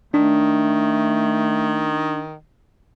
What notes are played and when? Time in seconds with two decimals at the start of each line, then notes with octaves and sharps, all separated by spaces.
0.14 D#3 A3 D4